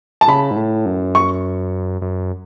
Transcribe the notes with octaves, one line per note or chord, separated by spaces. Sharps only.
A5
C#3 B5
G#2
A2
F#2
C#6
F#2